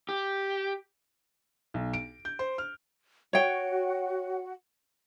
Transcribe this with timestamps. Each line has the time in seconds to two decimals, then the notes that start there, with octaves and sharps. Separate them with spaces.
0.09 G4
1.74 B1
1.93 D7
2.25 G6
2.39 C5
2.58 F6
3.33 F#4 C#5 F#5 G5